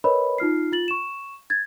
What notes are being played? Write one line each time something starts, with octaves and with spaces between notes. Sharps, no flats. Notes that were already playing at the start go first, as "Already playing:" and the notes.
A#4 B4 C#5 D#5 B5
D#4 F4 F6 C7
F4 A6 F#7
C#6 E7
G#6 A6